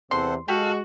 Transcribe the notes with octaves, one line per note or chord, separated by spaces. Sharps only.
E2 C3 A4 C5 F#5 C6
G#3 F#4 G4 A4 F5